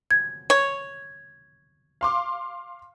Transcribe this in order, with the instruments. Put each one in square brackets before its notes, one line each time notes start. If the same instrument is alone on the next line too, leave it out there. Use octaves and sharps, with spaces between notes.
[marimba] G#6
[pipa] C#5
[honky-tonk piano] F5 C6 D6